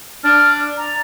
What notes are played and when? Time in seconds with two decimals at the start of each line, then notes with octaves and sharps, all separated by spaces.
0.24 D4 D5 F6
0.77 A#5